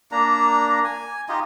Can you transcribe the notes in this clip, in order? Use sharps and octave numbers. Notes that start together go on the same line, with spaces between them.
A#3 D4 A#5
G#5
D#4 F4 G4 D#5